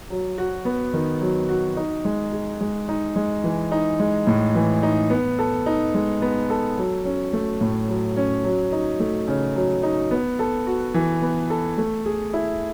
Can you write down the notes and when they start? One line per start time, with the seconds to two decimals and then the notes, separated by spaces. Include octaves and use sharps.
0.10 F#3
0.38 F#4
0.65 B3
0.93 D#3
1.21 F#3
1.49 F#4
1.77 D#4
2.05 G#3
2.32 G#4
2.61 G#3
2.88 D#4
3.16 G#3
3.44 E3
3.72 D#4
4.00 G#3
4.27 A2
4.55 E3
4.83 D#4
5.10 B3
5.39 A4
5.66 D#4
5.94 G#3
6.22 B3
6.50 A4
6.78 F#3
7.05 C#4
7.33 A3
7.61 A2
7.88 F#3
8.17 C#4
8.44 F#3
8.72 D#4
9.00 A3
9.28 C#3
9.56 F#3
9.83 D#4
10.11 B3
10.39 A4
10.67 F#4
10.94 E3
11.22 B3
11.50 A4
11.78 A3
12.05 G#4
12.34 E4